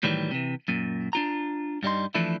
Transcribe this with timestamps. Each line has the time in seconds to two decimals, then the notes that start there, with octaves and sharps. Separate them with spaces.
0.03 A2 D#3 E3 F#3 G3
0.31 C3 E3
0.68 F#2 A#2
1.13 D4 F4 A#5
1.83 G2 G3 D#4 C6
2.15 E3 F3 A3 D4 E4